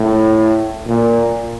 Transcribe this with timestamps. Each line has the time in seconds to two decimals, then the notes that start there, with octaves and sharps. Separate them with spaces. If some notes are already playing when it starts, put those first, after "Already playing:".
Already playing: A2
0.87 A#2